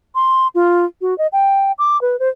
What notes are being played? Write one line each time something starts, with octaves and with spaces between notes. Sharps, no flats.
C6
F4
F#4
D#5
G5
D6
B4
C5